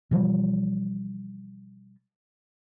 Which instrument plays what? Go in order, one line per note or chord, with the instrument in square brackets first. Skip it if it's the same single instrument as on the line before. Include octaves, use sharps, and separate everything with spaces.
[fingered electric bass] B2 E3 F3 G3